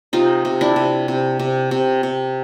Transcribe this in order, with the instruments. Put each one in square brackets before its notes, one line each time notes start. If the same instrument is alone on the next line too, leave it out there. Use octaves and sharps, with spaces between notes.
[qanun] C3 D#4 F4
C3
D4 E4
C3
C3
C3
C3
C3